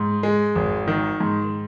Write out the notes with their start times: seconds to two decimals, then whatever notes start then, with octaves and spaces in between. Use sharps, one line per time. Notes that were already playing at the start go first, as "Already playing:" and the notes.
Already playing: G#2
0.23 G#3
0.55 G#1
0.88 D#3
1.20 G#2